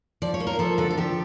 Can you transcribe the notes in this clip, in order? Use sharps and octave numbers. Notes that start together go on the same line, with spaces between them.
F3 D5
C#5
A#3
A#4
F3 A4
D3 A4
A4
F3 G4